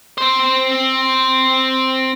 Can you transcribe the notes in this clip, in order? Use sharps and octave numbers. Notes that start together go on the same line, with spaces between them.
C4 C5